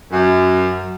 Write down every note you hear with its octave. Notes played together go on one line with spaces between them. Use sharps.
F#2